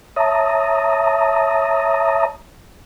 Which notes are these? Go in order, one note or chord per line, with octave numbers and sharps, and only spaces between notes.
C#5 E5 A5 A#5 D#6